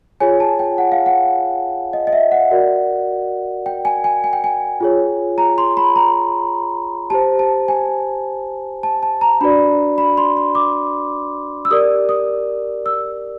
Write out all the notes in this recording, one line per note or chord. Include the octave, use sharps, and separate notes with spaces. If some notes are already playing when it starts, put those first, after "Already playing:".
F4 G#4 C#5 G#5
A5
G5
F#5
F5
F#5
D#5
D#5
E5
F#5
F#4 A#4 D5
G5
G#5
G#5
G#5
G5
G#5
F4 G#4 C#5
A#5
C6
B5
A#5
G4 C5 A5
A5
G#5
A5
A5
A#5
D4 F#4 B4 D5 B5
B5
C6
C6
D6
E6
G4 A#4 D5 D#6
D#6
E6